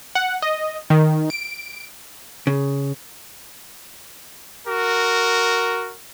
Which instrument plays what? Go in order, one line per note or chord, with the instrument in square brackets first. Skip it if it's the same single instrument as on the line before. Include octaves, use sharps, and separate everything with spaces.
[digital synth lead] F#5
D#5
D#3
D7
[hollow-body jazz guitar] C#3
[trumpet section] F#4 A#4